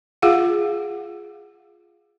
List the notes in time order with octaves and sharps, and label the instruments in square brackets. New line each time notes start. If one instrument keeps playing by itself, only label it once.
[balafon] F4 G#4 F5 F#5